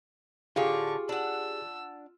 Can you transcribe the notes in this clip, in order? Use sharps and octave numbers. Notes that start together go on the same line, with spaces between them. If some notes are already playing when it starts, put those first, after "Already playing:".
A2 D3 F4 G4 G#4 C#6 D6
D4 F#5 E6